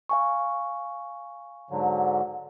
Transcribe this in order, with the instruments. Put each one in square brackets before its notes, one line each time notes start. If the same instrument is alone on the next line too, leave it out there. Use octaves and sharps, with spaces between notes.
[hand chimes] F5 G#5 C#6
[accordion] G#2 D3 F#3